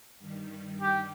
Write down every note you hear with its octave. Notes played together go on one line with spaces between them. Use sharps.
G2 D#3 G3
G4